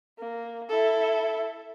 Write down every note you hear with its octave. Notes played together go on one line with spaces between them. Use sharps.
A#3
E4 A4